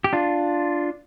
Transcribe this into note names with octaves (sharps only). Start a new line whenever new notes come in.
G4
D4 F4